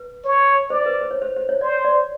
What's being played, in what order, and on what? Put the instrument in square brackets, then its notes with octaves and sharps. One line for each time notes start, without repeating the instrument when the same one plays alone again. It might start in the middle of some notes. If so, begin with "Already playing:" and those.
Already playing: [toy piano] B4
[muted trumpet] C#5
[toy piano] C5 [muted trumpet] D5
[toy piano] B4
C5
C#5
C5
C5
C#5
[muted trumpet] C5 [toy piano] D5
[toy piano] D5